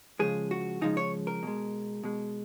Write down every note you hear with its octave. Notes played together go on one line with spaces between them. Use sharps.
C#3 F3 G#3 G#4
F#4
C#3 F3 G#3 D#4
C#5
A#4
B2 G#3
B2 G#3